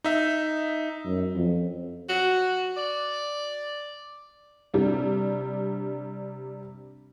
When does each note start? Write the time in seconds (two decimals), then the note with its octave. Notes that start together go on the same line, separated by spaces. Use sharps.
0.04 D#4 E5
1.05 F#2
1.35 F2
2.09 F#4
2.77 D5
4.74 C3 G3 D4